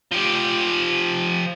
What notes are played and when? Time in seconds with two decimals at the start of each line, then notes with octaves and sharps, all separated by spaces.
0.11 F3 G4